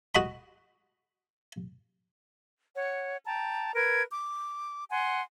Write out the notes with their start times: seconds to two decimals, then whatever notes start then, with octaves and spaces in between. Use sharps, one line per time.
0.15 F#4 D#5 B5
2.76 C#5 F#5
3.25 G5 A5 A#5
3.75 A#4 B4 G#6
4.10 D6
4.90 F#5 G#5 C6